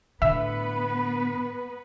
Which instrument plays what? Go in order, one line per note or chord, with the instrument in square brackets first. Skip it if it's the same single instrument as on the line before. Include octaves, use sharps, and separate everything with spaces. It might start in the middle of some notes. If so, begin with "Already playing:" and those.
[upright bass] A2 D3 [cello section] B3 B4 [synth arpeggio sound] E5